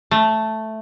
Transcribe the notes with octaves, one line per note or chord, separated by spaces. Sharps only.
A3